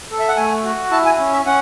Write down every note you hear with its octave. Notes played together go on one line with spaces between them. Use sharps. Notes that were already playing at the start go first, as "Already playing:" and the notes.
A4
E5
F#5
A3 G#5
F#4
E4 A5
G#5
C#4
E5
C#4 F#5